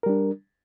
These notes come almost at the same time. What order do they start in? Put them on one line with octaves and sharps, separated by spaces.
A#4 G3 D4